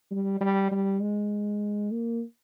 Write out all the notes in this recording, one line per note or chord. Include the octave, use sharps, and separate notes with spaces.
G3
G3
G3
G#3
A#3